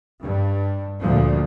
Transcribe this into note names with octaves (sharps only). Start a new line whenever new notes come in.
G2
D2 A#2 F3